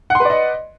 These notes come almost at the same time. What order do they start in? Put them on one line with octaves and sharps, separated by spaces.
F#5 C6 B4 D5 D#5